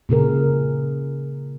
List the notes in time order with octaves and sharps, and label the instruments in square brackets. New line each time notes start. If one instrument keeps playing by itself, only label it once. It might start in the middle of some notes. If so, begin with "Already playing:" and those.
[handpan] A#2 C#3 G#4 A#4